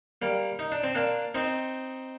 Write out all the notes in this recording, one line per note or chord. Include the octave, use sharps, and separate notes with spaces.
G3 A#3
D#4
D4
C4
A#3 D4
C4 D#4